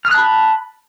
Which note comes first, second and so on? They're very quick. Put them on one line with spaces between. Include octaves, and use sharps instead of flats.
F6 D#6 F#6 A5 B5